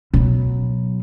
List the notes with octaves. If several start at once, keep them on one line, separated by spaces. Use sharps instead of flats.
B2 F#3